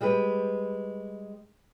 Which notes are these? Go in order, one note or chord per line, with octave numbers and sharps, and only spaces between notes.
G3 G#3 G4 B4